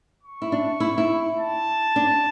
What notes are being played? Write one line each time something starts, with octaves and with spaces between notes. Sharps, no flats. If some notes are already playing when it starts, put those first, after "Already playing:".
C#6
E4
D4
E4
E4
A5
D4